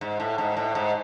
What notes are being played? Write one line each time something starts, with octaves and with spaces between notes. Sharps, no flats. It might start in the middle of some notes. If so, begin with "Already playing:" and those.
G#2
A2
G#2
A2
G#2